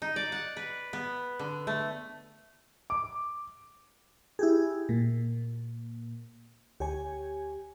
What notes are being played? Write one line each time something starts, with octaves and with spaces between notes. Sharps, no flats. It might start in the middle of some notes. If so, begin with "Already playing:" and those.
D#4
D5
F#5
B4
B3
D3
A3
D6
E4 G4 G#4
A#2
D2 G4 C#5 G#5